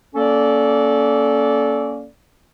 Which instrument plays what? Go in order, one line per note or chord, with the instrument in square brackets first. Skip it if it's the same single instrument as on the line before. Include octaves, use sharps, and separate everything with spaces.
[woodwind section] A#3 C#4 A4 D5